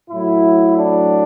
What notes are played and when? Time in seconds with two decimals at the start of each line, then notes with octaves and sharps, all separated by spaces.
0.10 A2 F#3 E4
0.76 D4